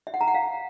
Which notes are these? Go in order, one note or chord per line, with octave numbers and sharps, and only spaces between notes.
E5
F#5
A#5
F#5
F5